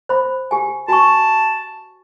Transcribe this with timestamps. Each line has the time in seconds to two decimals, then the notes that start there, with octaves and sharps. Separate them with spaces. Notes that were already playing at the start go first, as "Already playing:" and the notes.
0.09 C5 B5
0.51 G4 G#5
0.88 F#4 G#5 A5 C#6